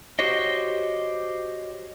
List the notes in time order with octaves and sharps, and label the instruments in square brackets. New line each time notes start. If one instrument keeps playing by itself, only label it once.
[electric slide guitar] F#4 G4 C5 C#5 D#5